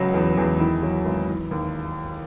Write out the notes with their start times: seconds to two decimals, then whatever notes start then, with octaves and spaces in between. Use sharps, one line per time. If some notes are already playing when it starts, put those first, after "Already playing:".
Already playing: C#2 F#3
0.14 E2
0.37 E2
0.60 D#3 E4
0.83 F#3
1.05 G#1
1.28 E3
1.51 D#2